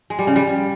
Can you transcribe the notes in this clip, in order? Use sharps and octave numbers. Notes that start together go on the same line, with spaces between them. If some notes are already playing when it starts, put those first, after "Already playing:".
G#3
G3
C#3
G3